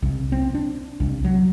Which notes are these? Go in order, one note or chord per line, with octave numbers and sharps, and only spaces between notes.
C2
C4
D4
C2
F#3